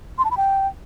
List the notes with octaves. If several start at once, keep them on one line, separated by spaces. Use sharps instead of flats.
C6
A5
B5
G5